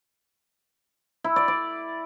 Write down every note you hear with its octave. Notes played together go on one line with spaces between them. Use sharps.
E4
D5
D5